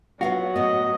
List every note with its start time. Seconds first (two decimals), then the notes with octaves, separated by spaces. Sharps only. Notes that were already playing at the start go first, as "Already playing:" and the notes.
0.21 F#3 B3 F4 F#4 F5
0.56 A2 B3 D#5